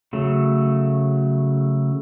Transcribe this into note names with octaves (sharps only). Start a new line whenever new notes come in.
C#3 F#3 A3